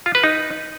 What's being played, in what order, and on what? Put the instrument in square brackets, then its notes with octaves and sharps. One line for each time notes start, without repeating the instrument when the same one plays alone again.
[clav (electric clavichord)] F4
B4
D#4